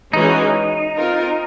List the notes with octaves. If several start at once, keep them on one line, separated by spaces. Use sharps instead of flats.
E3 G#3 C#4 D#4 F#4
C4 F4 A#4